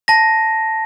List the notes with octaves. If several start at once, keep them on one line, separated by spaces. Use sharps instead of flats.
A5 A#6